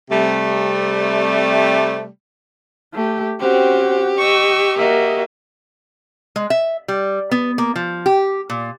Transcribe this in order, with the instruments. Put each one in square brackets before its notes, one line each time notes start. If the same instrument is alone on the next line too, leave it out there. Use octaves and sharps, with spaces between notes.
[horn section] C3 G3 A3
[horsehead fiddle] A3 G4
[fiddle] C4 [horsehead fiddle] C#4 F#4 [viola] G4
[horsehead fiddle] D#5 [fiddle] C#6 E6
[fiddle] A#3 F#4 [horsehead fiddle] D#5 E5
[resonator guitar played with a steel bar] G#3
E5
G3
B3
A#3
F3
G4
A#2